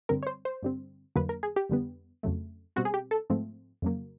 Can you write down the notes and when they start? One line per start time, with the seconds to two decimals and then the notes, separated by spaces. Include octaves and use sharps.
0.09 G2 D3 G3 C4 A#4
0.23 C#5
0.27 C5
0.45 C5
0.63 G2 D3 G3 C4
1.16 F2 D3 F#3 A#3 B4
1.29 A#4
1.43 G#4
1.56 G4
1.69 F2 D3 G3 B3
2.23 F2 C#3 F#3 A3
2.76 B2 G3 C4 F#4
2.85 G#4
2.94 G4
3.11 A4
3.30 G#2 F3 A3 C4
3.82 F2 C#3 F#3 A#3